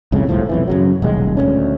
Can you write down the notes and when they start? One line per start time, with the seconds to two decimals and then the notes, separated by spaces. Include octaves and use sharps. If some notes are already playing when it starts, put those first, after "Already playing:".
0.12 C2 F2 A2 C#3
0.29 G1 C2 A2 F3
0.49 B1 F2 E3
0.67 F#2 C#3 F#3
1.02 D#1 B1 G#3
1.37 D2 A3 C#4